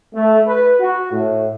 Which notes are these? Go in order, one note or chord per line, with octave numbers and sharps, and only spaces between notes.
A3
B4
F#4
A2